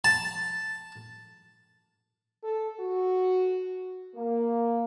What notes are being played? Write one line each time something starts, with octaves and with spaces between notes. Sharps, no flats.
A5
A4
F#4
A#3